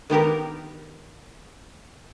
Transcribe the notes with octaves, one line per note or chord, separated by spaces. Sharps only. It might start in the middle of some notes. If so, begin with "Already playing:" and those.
D#3 B3 G4 A#4